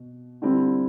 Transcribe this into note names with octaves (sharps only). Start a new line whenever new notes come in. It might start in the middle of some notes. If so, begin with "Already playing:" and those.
Already playing: B2
D3 G3 C4 E4